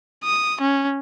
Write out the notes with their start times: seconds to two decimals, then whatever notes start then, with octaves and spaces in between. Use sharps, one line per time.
0.24 D#6
0.61 C#4